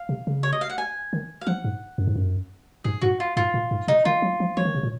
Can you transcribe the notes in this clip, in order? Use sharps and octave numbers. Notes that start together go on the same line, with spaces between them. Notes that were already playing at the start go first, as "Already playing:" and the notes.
Already playing: F5
C3
C#3
C#5
D#5
F5
F#5
G#5
D#3
F5
F3 F#5
G#2
F#2
G#2
F#2
G#2 G#4
G#2 F#4
F4
G#2 F4
A#2
G#2
C3 D#4
D#3 F4
F#3
F3
F3 C#5
D#3
C3
A#2